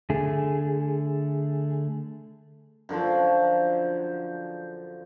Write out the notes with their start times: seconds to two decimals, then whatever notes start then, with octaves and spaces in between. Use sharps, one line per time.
0.10 D3 A3 G#4
2.89 F#2 D3 F3 C5